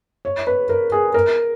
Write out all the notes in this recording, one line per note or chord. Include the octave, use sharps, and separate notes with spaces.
C#5
B4
A#4
G#4
A#4